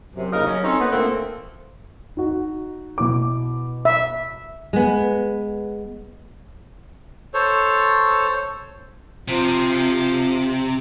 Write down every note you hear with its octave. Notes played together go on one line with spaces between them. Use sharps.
F#2 C3
D#2 C#3 D#4 A#4 D#5 F5
F#3 C#4
C4 C#4 D#4 A4 C5 C#5
A#3 B3 C5
A#2 D3 A3 A#3 C4 A4
D#4 F#4
B2 E4 D6
E5
G#3 B3
A4 C5 C#5
C3 F3